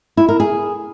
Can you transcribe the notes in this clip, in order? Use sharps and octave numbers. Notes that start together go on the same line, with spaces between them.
E4
A#4
G#4